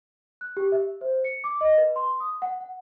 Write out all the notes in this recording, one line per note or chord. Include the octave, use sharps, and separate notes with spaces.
F#6
G4
E5
C5
C#7
D6
D#5
B4
C6
D#6
F#5
F#5